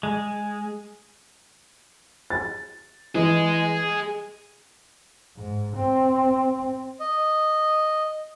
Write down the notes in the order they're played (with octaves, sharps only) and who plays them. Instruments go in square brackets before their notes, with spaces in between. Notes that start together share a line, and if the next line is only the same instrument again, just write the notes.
[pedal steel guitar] G#3
[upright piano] A6
[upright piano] E3 [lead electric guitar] G#4 D#5
[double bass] G#2
C4
[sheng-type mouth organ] D#5